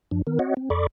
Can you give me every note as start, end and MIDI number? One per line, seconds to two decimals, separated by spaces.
0.11 0.22 42
0.11 0.22 53
0.11 0.22 62
0.27 0.39 51
0.27 0.39 59
0.27 0.39 70
0.39 0.54 60
0.39 0.54 66
0.39 0.54 73
0.39 0.54 75
0.39 0.54 78
0.57 0.69 60
0.70 0.87 41
0.70 0.87 69
0.70 0.87 74
0.70 0.87 83
0.70 0.87 85
0.70 0.87 86